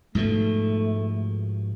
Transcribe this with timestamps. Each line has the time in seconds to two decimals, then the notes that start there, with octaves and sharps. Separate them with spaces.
0.15 G#2 B2 F3 A3